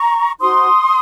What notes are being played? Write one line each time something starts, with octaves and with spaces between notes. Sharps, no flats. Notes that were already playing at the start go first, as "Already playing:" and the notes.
Already playing: A#5 C#6
D#4 F#4 C5 C6 D#6